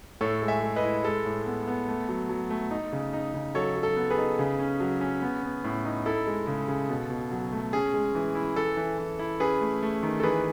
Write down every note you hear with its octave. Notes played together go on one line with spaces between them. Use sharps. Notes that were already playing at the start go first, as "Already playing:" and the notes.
A2 A4 C#5
G#3
E5 G#5
G#3
B4 D#5
E4
G#3 A4
A2
B3
B3
A3
F#3
F#3
A3
D#4
C#3
D#4
C#3
F#3 A4 C#5
F#3
A4
B3
G#4 B4
D#4
C#3
C#4
F#3
C#4
B3
B3
A2
D#4
E4 A4
G#3
C#3
C#3
B2
B2
F#3
A3
C#4 G#4
G#3
E3
E4
E3 A4
E3
E3
E4
C#4 G#4 B4
A3
A3
D#3
A4
E3 G#4 B4